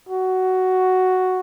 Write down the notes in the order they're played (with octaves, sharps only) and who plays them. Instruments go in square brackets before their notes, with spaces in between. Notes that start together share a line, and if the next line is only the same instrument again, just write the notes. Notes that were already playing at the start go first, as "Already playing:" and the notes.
[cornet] F#4